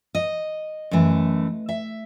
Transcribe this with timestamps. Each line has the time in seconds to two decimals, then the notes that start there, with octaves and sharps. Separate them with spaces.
0.15 D#5
0.91 F#2 E3 A3
1.69 E5